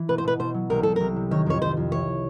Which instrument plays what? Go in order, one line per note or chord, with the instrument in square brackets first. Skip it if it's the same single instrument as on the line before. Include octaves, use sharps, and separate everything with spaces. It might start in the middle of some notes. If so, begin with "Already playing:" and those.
Already playing: [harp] E3
[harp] B2 [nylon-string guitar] B4
[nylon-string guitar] C5
[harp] B2 [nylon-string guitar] B4
[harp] B2 [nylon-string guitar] C5
[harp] F#3
[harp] C2 [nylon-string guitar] A#4
[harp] C2 [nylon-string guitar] A4
[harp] C2 [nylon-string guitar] A#4
[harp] C3
[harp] D#3 [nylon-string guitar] C#5
[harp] F2 [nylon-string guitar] C#5
[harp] F2 [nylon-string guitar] C5
[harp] F2
[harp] E3 [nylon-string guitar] C#5